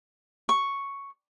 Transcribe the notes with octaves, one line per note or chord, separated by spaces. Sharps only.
C#6